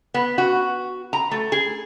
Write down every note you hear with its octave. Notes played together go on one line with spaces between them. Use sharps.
B3
F#4
A#5
A3
G#4